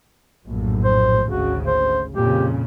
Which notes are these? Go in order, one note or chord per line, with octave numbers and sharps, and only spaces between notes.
A#1 F#2 A2
C5
G#1 D2 C#3 F#4
C5
F2 A#2 C#3 G4